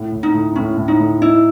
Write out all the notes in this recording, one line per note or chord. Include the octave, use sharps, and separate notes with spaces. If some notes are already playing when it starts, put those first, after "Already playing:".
Already playing: A2
A2
D#4
A2
A2 C#4
A2
D#4
A2
D#4 E4